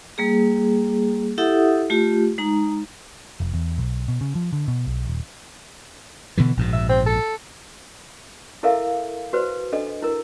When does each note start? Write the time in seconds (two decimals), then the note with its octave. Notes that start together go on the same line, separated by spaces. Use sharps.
0.18 G3 A#3 G#4
1.38 E4 G4 A4 E5 F#5 D#6
1.90 A3 F4 G4
2.38 G#3 D#4 A#5
3.40 F1
3.54 E2
3.78 B1
4.08 B2
4.21 C#3
4.35 F3
4.53 D3
4.68 B2
4.86 B1
5.07 D#1
6.37 B2 D3 E3
6.57 A#1 G#2 B2
6.73 E5
6.89 C4
7.06 A4
8.63 E4 A4 A#4 E5 F5
9.33 F#4 B4 C5
9.72 D4 A4 D#5
10.02 E4 A#4